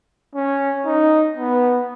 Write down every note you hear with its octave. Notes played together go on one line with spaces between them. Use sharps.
C#4
D#4
B3